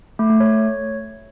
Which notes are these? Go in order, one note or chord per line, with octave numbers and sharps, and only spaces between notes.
A3
A3
C#5